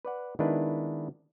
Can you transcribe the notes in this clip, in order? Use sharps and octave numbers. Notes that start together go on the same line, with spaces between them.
B4 D5 F#5
D#3 G#3 B3 D4 E4 B4